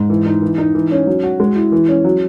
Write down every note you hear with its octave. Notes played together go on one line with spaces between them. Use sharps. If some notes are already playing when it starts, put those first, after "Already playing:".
Already playing: G#2
E3
D#4
E3
D#4
E3
C#4
F#3
F#4
G#3
E4
E3
C#4
F#3